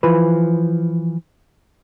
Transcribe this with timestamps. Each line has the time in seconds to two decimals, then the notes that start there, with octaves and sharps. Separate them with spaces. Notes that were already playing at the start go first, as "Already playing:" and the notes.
0.03 E3 F3 B4